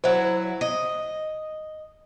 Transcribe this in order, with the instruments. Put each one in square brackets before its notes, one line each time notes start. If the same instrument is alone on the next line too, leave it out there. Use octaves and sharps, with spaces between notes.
[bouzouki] F#3 E4 [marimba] C5
[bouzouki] D#5